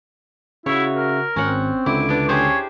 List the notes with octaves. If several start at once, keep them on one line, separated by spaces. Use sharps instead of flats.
C#3 E4 F#4 C#5 E5
A#4
G#1 C4 C#4 F#5
C#2 D3 E4 D6
B3 D4
C#4 G4 G#4 C5 C#5